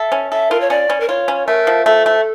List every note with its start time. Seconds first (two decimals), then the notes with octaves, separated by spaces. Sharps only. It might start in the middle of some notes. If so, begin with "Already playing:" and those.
Already playing: A4 E5
0.12 C#4
0.31 A4 E5
0.51 F4 A#4
0.61 C#5
0.70 C#4 D5
0.90 C#4
1.00 A#4
1.09 F4 C#5
1.28 C#4
1.47 A3 A#4
1.67 F3
1.86 A3 A4
2.06 A3